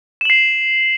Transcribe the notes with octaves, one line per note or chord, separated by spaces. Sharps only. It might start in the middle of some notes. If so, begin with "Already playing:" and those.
C7 E7 F#7